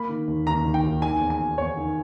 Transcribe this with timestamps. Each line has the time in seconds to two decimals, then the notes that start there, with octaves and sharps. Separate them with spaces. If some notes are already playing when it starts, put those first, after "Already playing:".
Already playing: A#3 B5
0.09 D#3
0.28 D#2
0.47 D#2 A#5
0.65 D#3
0.74 G5
0.83 D#2
1.02 D#3 G#5
1.21 E2
1.30 G#5
1.40 E2
1.58 E2 C#5
1.77 D#3